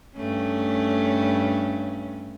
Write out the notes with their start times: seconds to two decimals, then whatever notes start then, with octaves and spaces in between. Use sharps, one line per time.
0.16 G2 A3 C#4